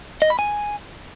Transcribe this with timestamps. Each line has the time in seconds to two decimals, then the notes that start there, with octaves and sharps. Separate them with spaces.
0.22 D#5
0.30 B5
0.39 G#5